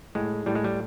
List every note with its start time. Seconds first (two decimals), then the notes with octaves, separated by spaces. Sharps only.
0.15 A2 G#3
0.46 A2 G3
0.55 G#3
0.64 G3